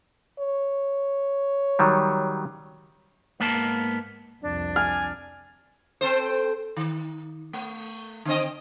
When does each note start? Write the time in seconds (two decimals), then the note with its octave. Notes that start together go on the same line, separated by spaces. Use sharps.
0.39 C#5
1.79 D#3 F#3 G3
3.40 G#2 A#3 B3 A#4 A5
4.42 C2 F2 D4
4.76 G#5 F6
6.01 C4 A4 C5
6.77 D#3
7.53 A3
8.25 D3 C4 D#5